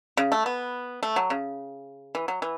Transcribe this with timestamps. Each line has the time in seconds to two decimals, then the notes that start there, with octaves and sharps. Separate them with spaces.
0.17 C#3
0.32 A3
0.46 B3
1.03 A3
1.16 F#3
1.30 C#3
2.15 E3
2.28 F#3
2.42 E3